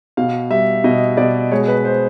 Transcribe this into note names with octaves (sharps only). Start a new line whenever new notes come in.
B2 F5
G3 E5
B2 D#5
B2 D5
G#3 C#5
B4
C5